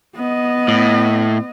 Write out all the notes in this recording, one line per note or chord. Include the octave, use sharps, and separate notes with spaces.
B3 D#5
A2